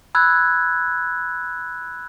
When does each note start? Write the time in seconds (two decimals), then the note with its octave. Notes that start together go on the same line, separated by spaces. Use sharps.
0.15 B5 E6 F#6 G#6